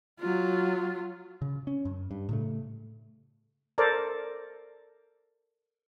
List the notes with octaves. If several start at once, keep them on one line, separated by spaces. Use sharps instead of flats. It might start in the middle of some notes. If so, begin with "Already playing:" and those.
F#3 F4
C#3
C#4
F#2
G2
A2 C#3 A3
A4 A#4 C5 D5